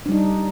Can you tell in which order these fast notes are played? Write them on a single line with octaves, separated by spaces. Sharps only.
D4 G3 D#4